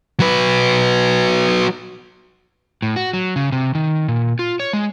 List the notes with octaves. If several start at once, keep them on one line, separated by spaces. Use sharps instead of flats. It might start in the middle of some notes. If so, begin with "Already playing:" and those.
F#3 B4
A2
F#4
F#3
C#3
C3
D#3
A#2
F4
C#5
G#3